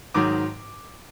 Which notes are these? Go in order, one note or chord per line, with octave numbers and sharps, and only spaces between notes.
G#2 D#3 F#3 D6